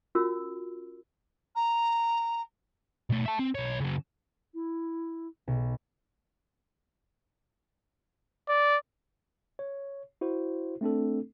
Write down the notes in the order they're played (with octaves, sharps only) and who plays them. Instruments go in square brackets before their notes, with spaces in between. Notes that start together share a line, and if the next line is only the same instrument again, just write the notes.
[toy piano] C#4 F4 F#4 A#4 E6
[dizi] A#5
[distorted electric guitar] B2 A3
E5 A5
C4
B1 C#5
C#3 F#3
[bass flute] E4
[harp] B1
[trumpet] D5
[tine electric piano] C#5
E4 F#4 C5
A3 C4 D4 A4